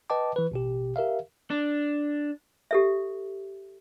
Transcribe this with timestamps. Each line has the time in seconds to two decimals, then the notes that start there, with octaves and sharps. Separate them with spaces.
0.10 B4 D#5 G5 A5 D6
0.36 E3 B4
0.51 A1 B2 G4
0.96 G4 A#4 E5 F5
1.50 D4
2.71 G4 A4 E5